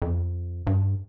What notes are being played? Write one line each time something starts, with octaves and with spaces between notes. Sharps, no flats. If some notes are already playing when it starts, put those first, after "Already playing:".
F2
G2